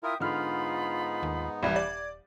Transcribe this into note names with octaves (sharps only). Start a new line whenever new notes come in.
E4 F4 A#4 E5 G5 D#6
G#2 D3 B3 D#4 F4 B5 F6
D#2
D#1 C2 E3 G3 G#6
D5